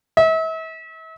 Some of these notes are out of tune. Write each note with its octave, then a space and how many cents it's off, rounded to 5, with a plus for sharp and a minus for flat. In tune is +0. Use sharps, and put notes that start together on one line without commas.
E5 -40